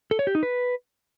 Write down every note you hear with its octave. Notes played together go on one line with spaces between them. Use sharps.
A4
C#5
G4
D#4
B4